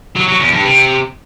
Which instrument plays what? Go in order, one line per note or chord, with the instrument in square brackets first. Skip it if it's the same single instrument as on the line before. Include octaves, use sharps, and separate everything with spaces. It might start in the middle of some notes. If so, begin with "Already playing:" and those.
[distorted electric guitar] F#3
F#3
E2
G2
C3